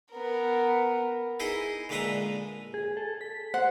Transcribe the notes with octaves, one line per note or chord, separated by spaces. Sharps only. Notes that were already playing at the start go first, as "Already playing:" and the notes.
B3 A#4
D#4 E4 G#4 D#5
A#2 D3 G#3 B4 E5 A#5
G#4
A4
B6
C5 F#5